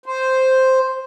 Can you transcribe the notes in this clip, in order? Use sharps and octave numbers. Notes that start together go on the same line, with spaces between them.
C5